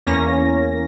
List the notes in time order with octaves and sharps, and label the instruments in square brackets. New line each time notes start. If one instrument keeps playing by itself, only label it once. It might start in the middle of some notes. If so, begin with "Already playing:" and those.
[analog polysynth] E2 A#3 C#4 A#6